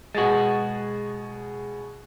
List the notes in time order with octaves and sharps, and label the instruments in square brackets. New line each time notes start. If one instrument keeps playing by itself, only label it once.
[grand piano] B2 G#4 A6 [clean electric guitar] G#3 F#4